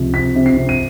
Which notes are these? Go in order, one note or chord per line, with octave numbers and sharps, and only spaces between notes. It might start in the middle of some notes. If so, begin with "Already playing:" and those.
Already playing: C#2 C3 F3
C3 B6
C3
C7
C3
D#7